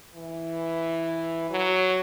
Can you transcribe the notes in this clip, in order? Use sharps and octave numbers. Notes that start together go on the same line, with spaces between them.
E3
F#3